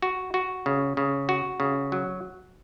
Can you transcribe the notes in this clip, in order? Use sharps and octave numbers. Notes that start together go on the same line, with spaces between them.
F#4
F#4
C#3
C#3
F#4
C#3
F#3